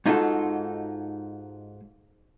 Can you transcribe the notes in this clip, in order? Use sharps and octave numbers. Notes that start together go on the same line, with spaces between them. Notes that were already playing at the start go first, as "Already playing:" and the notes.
G#2 D#4 F4 F#4 A4